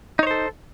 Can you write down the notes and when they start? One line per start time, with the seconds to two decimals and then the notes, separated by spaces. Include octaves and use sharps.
0.19 D#4
0.23 C#5
0.27 C5
0.31 A4